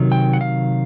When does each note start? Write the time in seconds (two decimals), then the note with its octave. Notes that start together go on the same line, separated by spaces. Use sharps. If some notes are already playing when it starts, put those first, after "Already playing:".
Already playing: C3 D#3 F#3
0.12 G5
0.33 F#5
0.41 F5